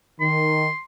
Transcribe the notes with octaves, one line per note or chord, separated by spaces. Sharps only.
D#3 C6